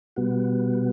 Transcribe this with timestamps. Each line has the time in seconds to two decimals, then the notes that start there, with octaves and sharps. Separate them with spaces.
0.16 B2 G3 B3 F#4